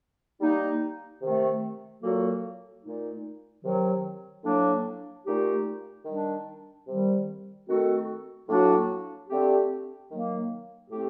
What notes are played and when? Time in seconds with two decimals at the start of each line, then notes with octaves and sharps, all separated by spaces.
0.40 G3 A#3 D#4
1.21 C3 D#3 A3
2.02 A#2 F#3 A#3 F#4 A4
2.84 A#2 A3 D#4
3.64 C3 D#3 F#3
4.44 A2 F#3 A#3 D4
5.26 A#2 A3 D#4 G4
6.05 D#3 G3 D4
6.87 C3 D#3 G3
7.67 D#3 A3 C4 F#4 A4
8.48 A2 F#3 A#3 D4 F#4
9.29 D3 A3 C4 G4
10.10 D#3 F#3 A#3
10.90 A2 A3 C4 G4